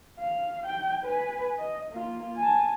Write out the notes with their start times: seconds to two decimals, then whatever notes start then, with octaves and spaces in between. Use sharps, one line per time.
0.19 F5
0.66 G5
1.04 B4 G#5
1.58 D#5
1.91 A#3 F4
2.36 G#5 A5